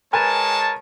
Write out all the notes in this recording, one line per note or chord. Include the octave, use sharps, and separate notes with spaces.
G#3 A#4 B4 C#5 G#5 A5